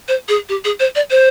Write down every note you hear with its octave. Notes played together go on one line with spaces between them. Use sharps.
C5
G#4
G4
G#4
C5
D5
C5